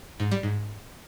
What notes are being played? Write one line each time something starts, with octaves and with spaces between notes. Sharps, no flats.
G#2
G3
G#2